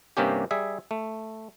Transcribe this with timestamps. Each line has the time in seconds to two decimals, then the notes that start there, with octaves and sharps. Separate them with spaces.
0.17 G2 C3 A#3 C#4 G4
0.51 G3 G#4 E5
0.91 A3